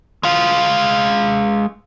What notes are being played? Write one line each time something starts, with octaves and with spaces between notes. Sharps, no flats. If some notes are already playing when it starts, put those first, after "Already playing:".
G#3 F5